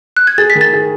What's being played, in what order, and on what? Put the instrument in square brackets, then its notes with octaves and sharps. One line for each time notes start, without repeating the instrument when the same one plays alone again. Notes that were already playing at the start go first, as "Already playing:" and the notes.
[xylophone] F#6
G#6
[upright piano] G#4 [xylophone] A6
[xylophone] B6
[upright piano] D#3
[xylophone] A6
[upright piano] G#4